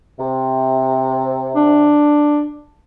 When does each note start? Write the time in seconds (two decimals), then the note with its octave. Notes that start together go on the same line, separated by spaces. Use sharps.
0.19 C3
1.55 D4